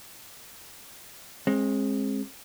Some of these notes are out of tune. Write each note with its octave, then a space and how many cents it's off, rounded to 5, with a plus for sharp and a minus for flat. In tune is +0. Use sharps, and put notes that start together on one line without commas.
G#3 +0 C4 +35